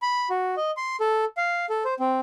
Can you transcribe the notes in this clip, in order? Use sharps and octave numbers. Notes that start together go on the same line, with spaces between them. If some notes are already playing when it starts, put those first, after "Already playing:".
B5
F#4
D#5
C6
A4
F5
A4
C5
C4